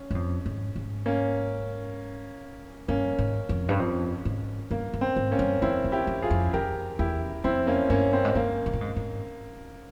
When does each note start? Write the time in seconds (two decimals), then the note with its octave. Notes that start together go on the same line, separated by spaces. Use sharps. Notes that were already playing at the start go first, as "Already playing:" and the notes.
Already playing: C#4
0.11 G2
0.15 F2
0.46 G#2
0.76 G#2
1.06 A#3 C#4
2.88 G2 A#3 C#4
3.18 G#2
3.49 F2
3.69 G2
3.79 F2
4.25 G#2
4.71 G2 A#3
4.93 G2
5.01 C4
5.16 G#2
5.31 A#3 C#4
5.39 G2
5.62 F2 C4 E4
5.84 E2
5.92 E4 G4
6.07 F2
6.22 F4 G#4
6.30 F2
6.53 F2 G4 A#4
6.99 E2 E4 G4
7.44 F2 C4 E4
7.67 A#3 C#4
7.90 G2 A#3 C#4
8.13 C4
8.25 G#2
8.35 G2 A#3
8.66 G#2
8.73 A#2
8.81 G#2
8.96 G#2